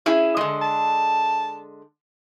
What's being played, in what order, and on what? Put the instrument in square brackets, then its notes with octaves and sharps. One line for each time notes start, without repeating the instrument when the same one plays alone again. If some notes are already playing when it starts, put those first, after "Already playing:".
[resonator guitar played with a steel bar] C#4 E4 G#4
D3 G#3
[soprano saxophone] A5